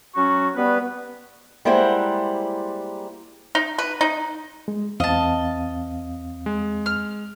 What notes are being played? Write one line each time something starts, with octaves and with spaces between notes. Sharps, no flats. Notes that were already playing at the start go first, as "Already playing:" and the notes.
F#3 C#4 F#4 C#6
G3 B3 B4
G3 G#3 A#3 E4 C5 F#5
D#4
B4
D#4
G#3
E2 C4 D#5 F5 A5
G#3
F6